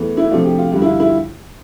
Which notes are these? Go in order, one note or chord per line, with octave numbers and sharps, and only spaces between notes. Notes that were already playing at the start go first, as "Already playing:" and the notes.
Already playing: E2 E3 A3
E4
C3 F3 A3 D4 F4
G4
F4
G2 D3 G3 F4
E4
F4
E4
F4